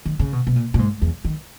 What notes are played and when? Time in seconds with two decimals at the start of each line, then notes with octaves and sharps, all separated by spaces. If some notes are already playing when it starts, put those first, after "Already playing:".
0.06 D#3
0.19 C#3
0.33 B2
0.47 B2
0.56 A#2
0.74 A#2
0.79 G#2
1.02 E2
1.25 D#3